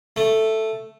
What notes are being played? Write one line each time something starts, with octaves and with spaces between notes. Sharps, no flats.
A3